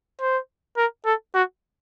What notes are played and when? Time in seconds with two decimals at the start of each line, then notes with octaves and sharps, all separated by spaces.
0.21 C5
0.77 A#4
1.06 A4
1.34 F#4